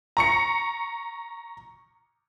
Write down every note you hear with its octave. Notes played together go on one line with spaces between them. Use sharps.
A#5 C#6 C#7